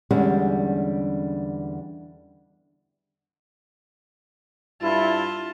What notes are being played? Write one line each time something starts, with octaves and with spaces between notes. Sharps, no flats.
E2 D3 G3 G#3 C#4 D4
G2 E4 F4 A5